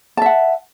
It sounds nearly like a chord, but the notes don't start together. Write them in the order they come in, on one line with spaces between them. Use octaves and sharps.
A5 E5 F#5